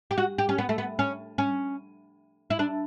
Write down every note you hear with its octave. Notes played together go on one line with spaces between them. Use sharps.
G4
F#4
G4
C#4
B3
A3
B3
C#4
C#4
E4
D4